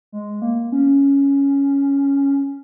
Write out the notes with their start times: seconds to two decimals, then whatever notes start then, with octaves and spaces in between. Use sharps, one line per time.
0.12 G#3
0.42 A#3
0.72 C#4